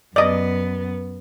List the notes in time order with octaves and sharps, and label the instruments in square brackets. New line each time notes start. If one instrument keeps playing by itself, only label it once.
[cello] F#2 B3 [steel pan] D5 D#5